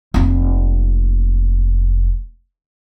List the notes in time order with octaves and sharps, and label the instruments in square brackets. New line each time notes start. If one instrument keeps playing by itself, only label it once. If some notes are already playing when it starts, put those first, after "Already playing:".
[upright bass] F1 A#3